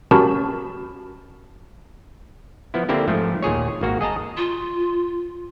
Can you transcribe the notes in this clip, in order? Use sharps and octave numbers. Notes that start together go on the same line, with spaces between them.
C#4 F#4 G4 A#4 A5 B5
F3 B3 E4
D3 A#3 C4 D4 E4 G4
G#2 F3 A3
D#2 A#2 G#4 C#5
G#1 A#3 F#4
G#4 D#5 A5 A#5
F4